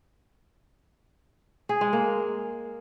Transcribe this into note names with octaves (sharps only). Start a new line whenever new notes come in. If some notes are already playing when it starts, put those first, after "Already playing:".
G#4
G#3
A#3